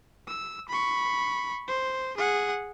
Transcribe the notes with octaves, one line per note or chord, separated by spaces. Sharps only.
E6
B5 C#6
C5
G#4 F#5